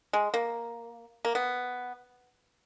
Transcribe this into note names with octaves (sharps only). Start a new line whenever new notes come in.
G#3
A#3
A#3
B3